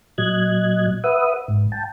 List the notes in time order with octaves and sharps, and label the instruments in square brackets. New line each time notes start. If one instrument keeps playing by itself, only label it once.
[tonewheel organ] A#2 F#3 D#5 F#6 G#6
B4 E5 F#5 D#6
G#2
G5 A5